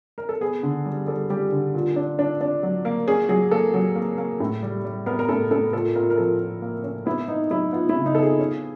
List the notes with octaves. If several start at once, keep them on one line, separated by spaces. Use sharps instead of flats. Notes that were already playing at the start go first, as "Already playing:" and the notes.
A#4
A4
B3 G#4
D3
G3
G3 A4
G3 G4
D3
A#2
D4
D4
D4
F#3
A#3
C#4 G#4
F#3 G#4
A#3 A4
F#3
A#3
A#3
A2
G3
G3
B3 A#4
A#4
A2 A4
A2 A4
A#2 A4
A#2 A#4
A#4
F3 A4
A#2
A#3
C#4
B3 E4
B3 D#4
F#3 E4
B3 F4
E4
C#3
D#4
B3 A4
G#4
C#4